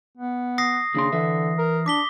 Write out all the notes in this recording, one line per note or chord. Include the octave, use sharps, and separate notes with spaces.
B3
D#6 A#6 C7
D#2 C#3 D4 C6
D3 E3 B4 E5
A#4
D4 D6 B6 G7